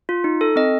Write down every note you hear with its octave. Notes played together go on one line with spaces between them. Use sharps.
F4
D#4
A4
C4 D#5